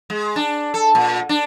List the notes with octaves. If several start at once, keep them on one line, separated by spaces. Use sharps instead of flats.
G#3
D4
A4
A#2
D4